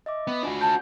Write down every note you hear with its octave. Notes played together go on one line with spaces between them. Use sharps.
D#5 E5 D6
B3 B5
D4 F4 F#4 G#5
A5 G6